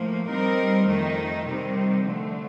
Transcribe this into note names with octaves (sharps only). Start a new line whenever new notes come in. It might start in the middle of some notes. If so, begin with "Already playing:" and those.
Already playing: A2 F3 A#3
G3 C4 D#4 A#4
F2 D#3 A3 D#4
C3 D#3 G3 C4 D#4
D3 F3 A3